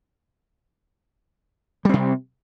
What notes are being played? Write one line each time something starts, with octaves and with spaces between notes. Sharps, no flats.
C3 G3 C4